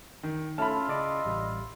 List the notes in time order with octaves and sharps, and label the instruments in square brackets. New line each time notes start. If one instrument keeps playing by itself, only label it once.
[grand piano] D#3
[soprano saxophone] A3 [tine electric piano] C#4 F6 [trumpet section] E4 F4 E5 [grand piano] A5 B5
[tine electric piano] C#3 D5 D6 [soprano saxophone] D#5
[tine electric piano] A1 G3